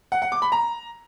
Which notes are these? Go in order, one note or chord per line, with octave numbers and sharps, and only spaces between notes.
F#5
F#5
D6
B5
A#5